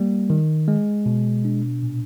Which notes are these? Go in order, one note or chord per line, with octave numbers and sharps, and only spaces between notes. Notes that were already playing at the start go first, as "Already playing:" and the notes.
Already playing: G3 A#3
D#3
G#3
B2
D4
A#2